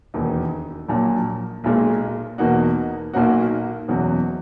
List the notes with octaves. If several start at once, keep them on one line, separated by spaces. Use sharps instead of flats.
E1 D#2 D#3
A#1 A#2 F#3
B1 A#2 G#3
E2 B2 A#3 D#4 F#4
B1 A#2 A#3 D#4 F#4
F#1 E2 B2 F#3